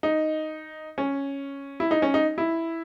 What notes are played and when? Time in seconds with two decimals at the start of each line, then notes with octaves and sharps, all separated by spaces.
0.03 D#4
0.98 C#4
1.80 E4
1.91 D#4
2.02 C#4
2.14 D#4
2.38 E4